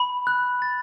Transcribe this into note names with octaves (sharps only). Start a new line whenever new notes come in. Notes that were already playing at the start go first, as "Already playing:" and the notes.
Already playing: B5
F#6
A6